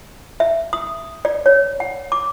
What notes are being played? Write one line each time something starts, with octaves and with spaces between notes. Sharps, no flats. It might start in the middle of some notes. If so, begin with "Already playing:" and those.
E5
D#6
D5
C#5
F#5
D6